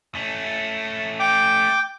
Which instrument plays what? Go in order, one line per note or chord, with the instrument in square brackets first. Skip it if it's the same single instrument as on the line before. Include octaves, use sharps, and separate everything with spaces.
[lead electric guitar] A3 C#4
[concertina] G5 D6